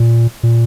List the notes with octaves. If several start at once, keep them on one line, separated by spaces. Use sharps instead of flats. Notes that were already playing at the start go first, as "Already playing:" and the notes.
Already playing: A#2
A#2